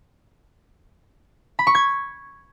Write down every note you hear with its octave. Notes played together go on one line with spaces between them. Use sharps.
B5
C#6
G#6